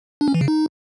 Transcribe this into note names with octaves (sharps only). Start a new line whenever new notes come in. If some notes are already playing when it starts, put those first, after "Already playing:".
D4
C#4
E3
C#3
D#4